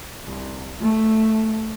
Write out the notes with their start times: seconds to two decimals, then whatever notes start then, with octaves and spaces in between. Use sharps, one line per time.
0.24 C2
0.81 A3